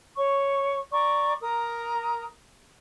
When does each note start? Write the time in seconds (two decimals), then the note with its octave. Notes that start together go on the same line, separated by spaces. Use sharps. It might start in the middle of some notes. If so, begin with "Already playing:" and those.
0.18 C#5 C#6
0.92 D5 A#5 C#6 D6
1.41 A#4 A#5 D#6